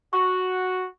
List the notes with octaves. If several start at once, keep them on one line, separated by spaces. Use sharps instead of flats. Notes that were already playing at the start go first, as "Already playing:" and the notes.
F#4 C#6